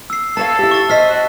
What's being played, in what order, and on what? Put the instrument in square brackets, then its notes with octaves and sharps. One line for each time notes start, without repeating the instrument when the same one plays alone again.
[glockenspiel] E6 C7
[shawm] A4 [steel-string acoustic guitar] B4 C#5 F5 [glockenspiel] A5
[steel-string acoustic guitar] E4 G4
[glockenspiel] C#6 A6
[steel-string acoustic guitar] C5 D#5 [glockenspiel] F6 B6
[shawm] F#4